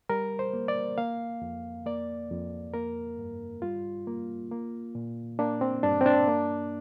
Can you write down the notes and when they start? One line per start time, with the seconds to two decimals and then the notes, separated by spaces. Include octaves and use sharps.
0.09 G3 A#4
0.39 C5
0.53 A#3
0.68 D5
0.98 A#3 F5
1.42 F2
1.86 A#3 D5
2.31 F2
2.74 A#3 A#4
3.19 G2
3.62 G3 F4
4.07 A#3
4.51 A#3
4.95 A#2
5.39 A#3 D4
5.61 C4
5.83 G2 D4
6.01 C4
6.06 D4
6.28 A#3